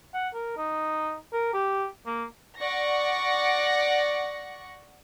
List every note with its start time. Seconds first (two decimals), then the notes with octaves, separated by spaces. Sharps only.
0.14 F#5
0.34 A#4
0.57 D#4
1.34 A#4
1.54 G4
2.06 A#3
2.60 D5 F#5 C#6 A#6